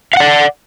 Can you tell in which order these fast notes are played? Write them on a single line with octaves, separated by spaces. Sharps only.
F5 F#5 D5